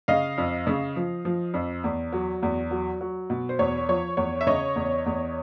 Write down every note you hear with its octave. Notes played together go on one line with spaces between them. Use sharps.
C#3 D#5 F5
F2
C#3
F3
F3
F2
E2
F#3
E2
F#3
F#3
B2
C5
E2 C#5
F3 C#5
E2 C#5
E5
C#3 C#5 D#5
E2
E2